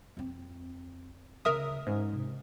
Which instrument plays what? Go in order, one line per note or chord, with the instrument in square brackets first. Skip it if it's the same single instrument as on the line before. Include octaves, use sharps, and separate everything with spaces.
[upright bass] F2 C4
[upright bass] D2 C#3 [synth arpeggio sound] A#4 E5 D#6
[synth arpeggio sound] G#2 [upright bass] C#4
[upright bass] C3